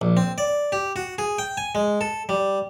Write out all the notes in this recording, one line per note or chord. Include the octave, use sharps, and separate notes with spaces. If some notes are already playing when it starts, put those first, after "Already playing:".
A#1
C4
D5
G4
F#4
G#4
G5
G#5
G#3
A4
G3